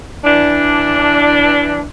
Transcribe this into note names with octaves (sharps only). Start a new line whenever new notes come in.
E3 D4